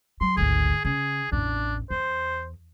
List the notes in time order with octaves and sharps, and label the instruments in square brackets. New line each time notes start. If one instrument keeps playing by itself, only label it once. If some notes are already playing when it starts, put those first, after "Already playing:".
[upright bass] F#3 [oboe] C6
[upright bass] G#1 D2 [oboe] G#4
[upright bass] C#3 [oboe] G#4
[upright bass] A1 E2 [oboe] D4
[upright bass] E2 [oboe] C5